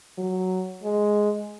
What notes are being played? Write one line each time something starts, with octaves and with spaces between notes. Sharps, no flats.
F#3
G#3